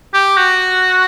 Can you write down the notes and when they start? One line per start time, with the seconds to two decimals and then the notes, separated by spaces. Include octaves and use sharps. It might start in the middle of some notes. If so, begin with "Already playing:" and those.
0.14 G4
0.37 F#4